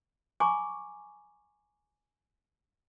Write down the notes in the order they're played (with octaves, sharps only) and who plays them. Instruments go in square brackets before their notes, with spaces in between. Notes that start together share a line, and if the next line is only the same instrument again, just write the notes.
[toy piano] G#5 A#5 C#6 D6